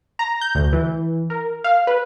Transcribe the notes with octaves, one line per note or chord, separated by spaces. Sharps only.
A#5
G6
D2
E3
A#4
F5
B4